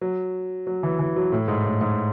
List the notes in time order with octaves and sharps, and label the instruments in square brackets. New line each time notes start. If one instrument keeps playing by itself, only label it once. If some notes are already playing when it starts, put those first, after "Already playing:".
[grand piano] F#3
F#3
E3
E3
F#3
A2
G#2
A2
G#2